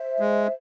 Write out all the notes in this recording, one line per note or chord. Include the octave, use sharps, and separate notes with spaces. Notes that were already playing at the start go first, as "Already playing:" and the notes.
Already playing: C5 E5
G#3